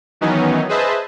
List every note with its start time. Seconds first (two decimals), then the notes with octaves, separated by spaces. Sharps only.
0.21 D#3 E3 F#3 B3 C#4 D#4
0.69 G#4 B4 C5 D#5 E5 A5